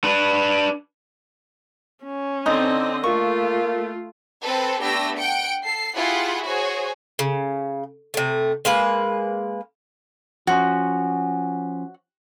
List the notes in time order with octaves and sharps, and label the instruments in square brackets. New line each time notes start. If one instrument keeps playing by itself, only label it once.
[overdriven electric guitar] D4 B4
[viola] C#4
[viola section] D3 C4 D#5 [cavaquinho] D#4 D#6
[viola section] A3 [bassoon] A#3 [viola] F4 [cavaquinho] C#6
[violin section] C4 A4 B4
A3 B3 D4 G4 E6 A#6
F#5 G5 C#7 D7
A4 C7
E4 F4 G4 G#4 F#5
F#4 G#4 C5 C#5
[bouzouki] C#3
C3 A3
G#3 A#3 B4
[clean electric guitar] F3 C#4 [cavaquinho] F#4